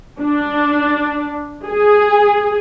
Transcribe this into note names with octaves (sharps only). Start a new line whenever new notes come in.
D4
G#4